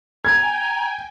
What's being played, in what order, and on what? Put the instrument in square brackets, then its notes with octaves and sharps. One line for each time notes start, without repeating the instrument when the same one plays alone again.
[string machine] G5 G#5 [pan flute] A#5 [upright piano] G#6